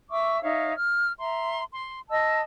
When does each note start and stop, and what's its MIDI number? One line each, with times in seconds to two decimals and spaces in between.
0.10 0.42 76
0.10 0.42 85
0.10 0.42 86
0.10 0.42 88
0.42 0.74 63
0.42 0.74 73
0.42 0.74 76
0.42 0.74 77
0.76 1.13 89
1.19 1.62 76
1.19 1.62 82
1.19 1.62 84
1.72 2.00 84
2.10 2.41 75
2.10 2.41 81
2.10 2.41 88